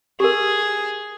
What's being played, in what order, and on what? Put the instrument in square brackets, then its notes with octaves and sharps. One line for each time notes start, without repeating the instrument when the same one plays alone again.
[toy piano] G4 A#4 [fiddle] G#4